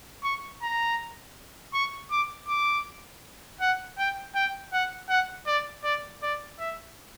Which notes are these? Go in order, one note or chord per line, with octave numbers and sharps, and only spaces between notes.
C#6
A#5
C#6
D6
D6
F#5
G5
G5
F#5
F#5
D5
D5
D5
E5